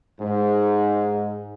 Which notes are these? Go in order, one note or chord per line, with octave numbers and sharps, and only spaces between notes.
G#2